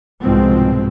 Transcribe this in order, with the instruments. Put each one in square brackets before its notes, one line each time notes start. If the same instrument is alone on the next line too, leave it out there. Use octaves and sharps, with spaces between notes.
[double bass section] C2 G#2 B2 F3 C4